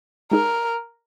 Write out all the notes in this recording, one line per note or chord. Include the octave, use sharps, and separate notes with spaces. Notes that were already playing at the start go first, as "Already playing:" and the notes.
G#3 D#4 G#4 A#4